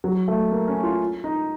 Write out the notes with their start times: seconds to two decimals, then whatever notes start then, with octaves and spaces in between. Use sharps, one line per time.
0.04 F#3
0.28 A3
0.51 A#3
0.68 C#4
0.83 F4
1.24 D#4